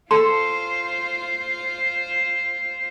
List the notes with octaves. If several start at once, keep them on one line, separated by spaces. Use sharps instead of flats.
F4 A4 C5 C6